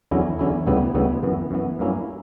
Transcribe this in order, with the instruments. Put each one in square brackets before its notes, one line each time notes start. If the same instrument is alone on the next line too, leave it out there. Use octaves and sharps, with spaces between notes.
[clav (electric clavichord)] E2 D3 F#3 C#4 E4
E2 D3 F#3 C#4 E4
D2 C#3 G3 B3 E4
D2 C#3 G3 B3 E4
F#2 E3 B3
F#2 E3 B3
G2 F#3 A#3 C#4 E4